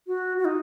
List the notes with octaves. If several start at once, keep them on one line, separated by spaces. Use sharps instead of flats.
F#4
F#4
D#4